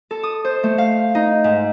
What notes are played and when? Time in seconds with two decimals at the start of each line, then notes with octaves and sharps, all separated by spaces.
0.11 A4
0.23 D#6
0.44 C5
0.63 A3
0.78 F5
1.15 D#4
1.44 G#2